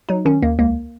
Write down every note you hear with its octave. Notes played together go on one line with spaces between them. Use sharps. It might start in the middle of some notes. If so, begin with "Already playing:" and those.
F#3 D#4
D#3 C#4
D#2 A#3
C#2 A#3